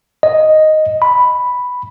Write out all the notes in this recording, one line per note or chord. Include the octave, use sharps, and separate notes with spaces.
D#5
B5